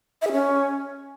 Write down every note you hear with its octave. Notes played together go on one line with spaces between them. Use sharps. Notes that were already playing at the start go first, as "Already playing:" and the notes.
E5
G#4
C#4